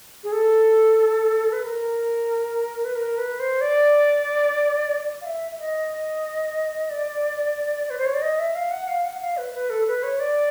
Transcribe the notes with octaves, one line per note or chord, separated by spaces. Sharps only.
G#4
A4
B4
A#4
B4
A#4
B4
C5
D5
F5
E5
E5
D#5
D5
B4
C5
C#5
D5
D#5
E5
F5
F#5
F5
F#5
F5
B4
B4
A4
B4
C#5
D5